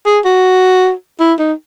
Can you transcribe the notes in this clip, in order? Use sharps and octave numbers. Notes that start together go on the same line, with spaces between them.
G#4
F#4
E4
D#4